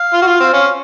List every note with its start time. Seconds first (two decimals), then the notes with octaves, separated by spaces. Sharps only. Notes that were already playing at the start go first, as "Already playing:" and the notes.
Already playing: F5
0.13 F4
0.22 F#4
0.27 F4
0.40 C4
0.53 C#4 F5